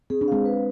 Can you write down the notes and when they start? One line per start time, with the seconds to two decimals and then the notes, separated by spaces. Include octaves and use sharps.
0.10 C4 G#4
0.21 D4
0.28 G#3 C4 F5
0.45 B4